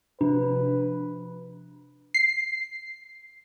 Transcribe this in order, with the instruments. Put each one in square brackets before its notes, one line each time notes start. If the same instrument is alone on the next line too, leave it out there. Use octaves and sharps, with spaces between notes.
[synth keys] C3 F3 [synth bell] D4 [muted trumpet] B4
[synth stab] C7